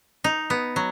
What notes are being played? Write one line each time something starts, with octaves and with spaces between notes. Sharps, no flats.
D#4
B3
F#3